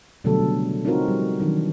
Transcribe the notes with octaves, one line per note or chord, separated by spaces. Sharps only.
B2 D3 F#3 G3 A3 A4
C#3
C4 C#4 D#4 F4 F#4 A#4
F3 G3
D#3 E3 F#3 D4